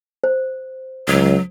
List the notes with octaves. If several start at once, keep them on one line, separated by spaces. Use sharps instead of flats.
C5
C#2 F#3